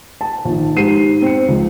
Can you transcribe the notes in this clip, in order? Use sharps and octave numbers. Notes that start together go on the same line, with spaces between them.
A5
A#1 D#3
G#2 G4 C7 D#7
C4 C#7
C#2 F3